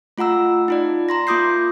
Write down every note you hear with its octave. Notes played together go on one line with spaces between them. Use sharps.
A3 F4 F#5 A#5 E6
D#4 F4 D5
A#5 C6 A#6
A#3 F4 D6 D#6 G6 C7